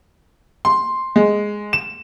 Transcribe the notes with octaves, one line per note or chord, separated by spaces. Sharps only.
C6
G#3
E7